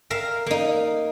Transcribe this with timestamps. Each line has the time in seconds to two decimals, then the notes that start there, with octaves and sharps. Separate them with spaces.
0.10 A#4 E5 F5 A#5
0.46 A#3 D#4